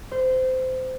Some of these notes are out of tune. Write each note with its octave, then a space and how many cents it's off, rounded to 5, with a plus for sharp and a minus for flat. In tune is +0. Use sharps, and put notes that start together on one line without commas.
C5 -20